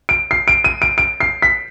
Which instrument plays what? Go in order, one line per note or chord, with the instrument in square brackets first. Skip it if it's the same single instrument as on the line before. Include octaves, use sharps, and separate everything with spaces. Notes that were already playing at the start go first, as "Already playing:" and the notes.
[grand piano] D7
C7
D7
D#7
D7
D7
C7
B6